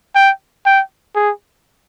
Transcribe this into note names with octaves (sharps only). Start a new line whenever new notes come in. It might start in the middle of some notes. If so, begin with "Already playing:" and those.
G5
G5
G#4